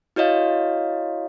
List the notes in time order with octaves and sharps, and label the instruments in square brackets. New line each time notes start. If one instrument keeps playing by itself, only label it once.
[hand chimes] E4 F#4 C#5 D#5 F5